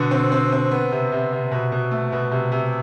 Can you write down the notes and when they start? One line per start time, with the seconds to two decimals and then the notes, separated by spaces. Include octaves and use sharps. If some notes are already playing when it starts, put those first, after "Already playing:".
Already playing: B2 D3
0.11 C4
0.32 C4
0.52 C4
0.71 B3
0.92 C3
1.12 C3
1.32 C3
1.51 B2
1.72 B2
1.91 A3
2.12 B2
2.31 C3
2.52 C3